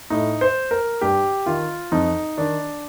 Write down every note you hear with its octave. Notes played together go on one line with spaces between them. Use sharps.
A2 D#4
C5
A#4
G2 G4
D#3 F4
F2 D#4
D#3 D4